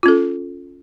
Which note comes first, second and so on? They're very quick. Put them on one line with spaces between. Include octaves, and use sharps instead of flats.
F4 C#4 A4